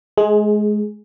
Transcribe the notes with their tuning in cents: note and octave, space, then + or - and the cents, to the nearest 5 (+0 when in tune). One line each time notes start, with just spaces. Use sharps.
G#3 +25 G#4 +0